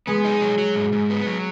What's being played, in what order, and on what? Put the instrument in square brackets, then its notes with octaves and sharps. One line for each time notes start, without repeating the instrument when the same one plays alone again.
[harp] G#3 [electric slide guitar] B3
[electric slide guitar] D#4
F#3
F#3
G#2
G#2
B3
F#3